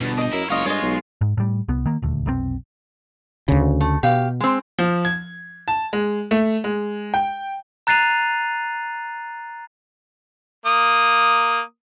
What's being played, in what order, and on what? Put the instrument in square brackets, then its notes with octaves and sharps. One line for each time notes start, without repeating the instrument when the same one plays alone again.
[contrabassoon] G1 [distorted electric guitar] E2 [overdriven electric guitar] B2
[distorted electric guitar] D4 G5 [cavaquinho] D#5
[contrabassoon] F#2 [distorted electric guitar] A#3 [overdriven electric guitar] E4
[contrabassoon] F#1 [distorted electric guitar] G#3 A#4 [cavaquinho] F4 D#5 [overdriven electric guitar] C#5
[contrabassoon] G2 [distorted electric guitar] G#3 [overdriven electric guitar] F4 [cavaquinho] C#5 D#5
[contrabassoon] B1
[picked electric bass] G#2
A2 G3
C2 B3
D#3 A#3
D#1 D2
F1 B1 B2 C4
[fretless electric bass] D2 C#3
[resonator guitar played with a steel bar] A3
[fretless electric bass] B2 [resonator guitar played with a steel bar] G4 F5
[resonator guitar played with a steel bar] G#3 C4
[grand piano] F3
G#6
A5
G#3
A3
G#3
G5
[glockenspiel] A#5 F#6 A6 C7 D#7 F7
[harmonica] A#3 D#6